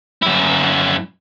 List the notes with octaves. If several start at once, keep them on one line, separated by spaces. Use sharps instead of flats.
F#2 E4